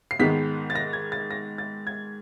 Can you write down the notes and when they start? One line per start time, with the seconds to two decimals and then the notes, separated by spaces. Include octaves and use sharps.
0.11 C7
0.19 G#2 D#3 G#3 B3 B6
0.70 A6
0.75 A#6
0.93 G#6
1.12 A6
1.31 A#6
1.58 A6
1.87 G#6